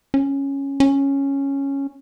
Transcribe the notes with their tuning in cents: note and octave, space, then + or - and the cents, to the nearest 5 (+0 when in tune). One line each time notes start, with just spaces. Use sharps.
C#4 -5
C#4 -5